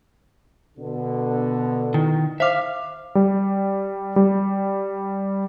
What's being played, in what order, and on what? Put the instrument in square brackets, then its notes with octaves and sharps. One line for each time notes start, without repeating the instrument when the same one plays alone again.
[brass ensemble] B2 D3
[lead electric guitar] D#3 [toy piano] E4
[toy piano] C5 D6 [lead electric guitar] E5 F5
[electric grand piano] G3
G3